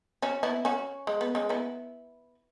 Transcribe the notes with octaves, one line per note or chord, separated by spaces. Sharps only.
C#4 F#4
B3 E4
C#4 F#4
G#3
B3
G#3 C#4
B3 E4